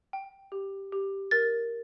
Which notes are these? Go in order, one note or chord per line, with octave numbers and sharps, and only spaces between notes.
G5
G4
G4
A#4 A6